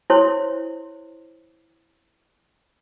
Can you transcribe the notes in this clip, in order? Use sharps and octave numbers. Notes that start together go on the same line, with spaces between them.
E4 C5 C#5 C6